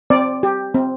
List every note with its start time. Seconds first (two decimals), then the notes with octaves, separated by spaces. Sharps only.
0.10 C4 D5
0.43 G4
0.74 C4